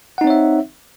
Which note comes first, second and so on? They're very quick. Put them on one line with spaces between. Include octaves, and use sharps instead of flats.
F#5 D#4 C4 C#5 E5